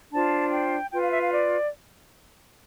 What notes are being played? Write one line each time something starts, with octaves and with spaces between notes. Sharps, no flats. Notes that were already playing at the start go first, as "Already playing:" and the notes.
D4 F4 C5 A5
G5
F4 B4 G5
F5
E5
F5
D5